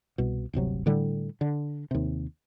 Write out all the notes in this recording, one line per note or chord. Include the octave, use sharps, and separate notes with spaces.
C2 B2
D1 G1 C3 F#3
A2 D3 G3
D3
D#2 C3